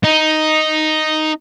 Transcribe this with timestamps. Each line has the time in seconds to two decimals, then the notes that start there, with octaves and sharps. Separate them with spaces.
0.04 D#4